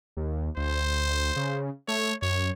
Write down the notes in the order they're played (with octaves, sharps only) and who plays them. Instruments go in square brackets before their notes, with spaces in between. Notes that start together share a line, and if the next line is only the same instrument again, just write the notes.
[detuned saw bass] D#2
[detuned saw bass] D2 [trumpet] C5
[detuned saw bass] C#3
[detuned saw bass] A3 [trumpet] C#5
[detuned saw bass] F#2 [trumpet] C#5